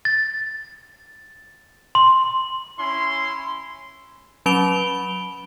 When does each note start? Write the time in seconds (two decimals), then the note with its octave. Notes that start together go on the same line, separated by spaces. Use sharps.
0.05 A6
1.95 C6
2.79 C#4 E4 C6
4.46 F#3 C#4 B5 D7 F7 G7